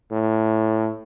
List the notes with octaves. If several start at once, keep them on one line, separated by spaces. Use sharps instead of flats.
A2